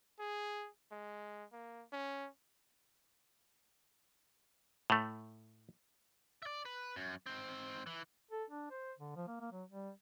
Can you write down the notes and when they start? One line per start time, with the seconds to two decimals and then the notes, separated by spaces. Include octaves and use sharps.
0.19 G#4
0.92 G#3
1.53 A#3
1.93 C#4
4.90 A2 A3
6.42 D5 E5
6.65 B4
6.96 F#2
7.26 G#2 C4
7.87 E3
8.31 A4
8.50 D4
8.70 C5
8.98 D3
9.16 F3
9.27 A#3
9.41 A#3
9.52 F#3
9.70 G3